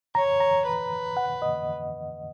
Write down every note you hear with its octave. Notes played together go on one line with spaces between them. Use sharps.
C#5 A#5
A#5
B4
F#5
D#5